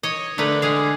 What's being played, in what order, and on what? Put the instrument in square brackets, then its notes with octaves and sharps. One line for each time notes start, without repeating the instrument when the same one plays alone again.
[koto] C#5 D#5
[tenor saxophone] D3 [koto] A3 A#4 B4
[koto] G#3 G#4 F5